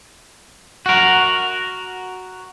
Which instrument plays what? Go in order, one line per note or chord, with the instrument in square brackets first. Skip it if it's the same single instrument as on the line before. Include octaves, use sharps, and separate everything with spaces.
[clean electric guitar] F#4 A#4